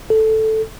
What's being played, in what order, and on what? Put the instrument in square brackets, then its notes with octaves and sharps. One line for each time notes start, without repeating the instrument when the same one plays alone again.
[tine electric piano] A4